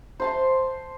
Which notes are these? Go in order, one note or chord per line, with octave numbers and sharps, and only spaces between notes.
C5 A5 C6